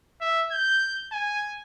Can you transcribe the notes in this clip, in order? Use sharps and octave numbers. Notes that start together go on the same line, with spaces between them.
E5
G6
G#5